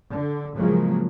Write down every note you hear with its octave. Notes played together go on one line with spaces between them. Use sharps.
D3
A2 C#3 F3 F#3 G#3 A#3